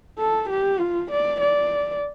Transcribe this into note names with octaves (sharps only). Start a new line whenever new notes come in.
A4
G4
F4
D5
D5